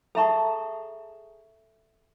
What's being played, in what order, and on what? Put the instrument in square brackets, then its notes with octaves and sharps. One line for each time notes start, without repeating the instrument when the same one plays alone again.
[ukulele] G#4 A5 A#5 [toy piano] A4 E5 C#6